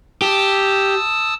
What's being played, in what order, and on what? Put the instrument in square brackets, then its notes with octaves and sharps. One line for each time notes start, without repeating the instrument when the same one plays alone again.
[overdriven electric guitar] G4 [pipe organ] A5 D#6 E6